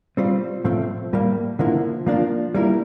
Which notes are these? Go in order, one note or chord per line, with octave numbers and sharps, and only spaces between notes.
G3 C4 F4 C5
A2 F3 A3 C4
A2 G3 A#3
D3 F3 A#3 E4
F3 A#3 D4 F4
G3 A#3 E4 A#4